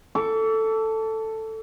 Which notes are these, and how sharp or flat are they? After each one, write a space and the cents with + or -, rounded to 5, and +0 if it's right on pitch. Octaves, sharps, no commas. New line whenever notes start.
A4 +5 D6 -45